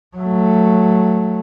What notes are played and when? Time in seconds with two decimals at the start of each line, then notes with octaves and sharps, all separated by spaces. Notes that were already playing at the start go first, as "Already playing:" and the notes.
0.17 F#3 A3